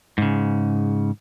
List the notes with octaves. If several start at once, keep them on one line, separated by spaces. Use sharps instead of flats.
G#2 C#3